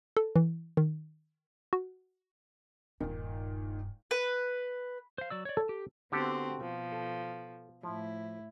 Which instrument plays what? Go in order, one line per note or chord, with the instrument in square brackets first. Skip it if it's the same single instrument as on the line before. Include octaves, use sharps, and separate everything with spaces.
[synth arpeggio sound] A4
E3
D#3
F#4
[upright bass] D#1 G2 [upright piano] A#2 D#3
[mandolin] B4
[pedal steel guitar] C5 F5
F#3 D5 E6
C#5 D5
[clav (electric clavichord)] A4
[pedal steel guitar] G4
[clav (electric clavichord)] D3 G4 A4 [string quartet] B3 C4 F#4
[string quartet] B2 F3
[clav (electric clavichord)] A4
[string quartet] A2 E4 [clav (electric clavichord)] F3